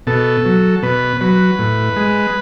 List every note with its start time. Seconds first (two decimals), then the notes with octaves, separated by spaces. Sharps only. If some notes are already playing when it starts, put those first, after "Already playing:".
0.07 B2 A4
0.45 F#3
0.83 B2 B4
1.21 F#3 B4
1.59 A2
1.96 G#3